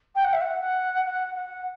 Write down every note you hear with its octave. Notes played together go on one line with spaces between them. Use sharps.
G5
F#5
E5
F#5
F#5
F#5
F#5